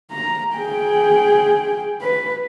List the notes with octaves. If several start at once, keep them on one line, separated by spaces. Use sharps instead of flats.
A#5
G#4 G5
B4